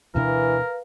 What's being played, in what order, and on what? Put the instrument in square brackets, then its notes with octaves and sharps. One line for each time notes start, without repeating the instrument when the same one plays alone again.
[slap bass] D2 B2 D4 [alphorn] E3 [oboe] A#4 [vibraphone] B4 F5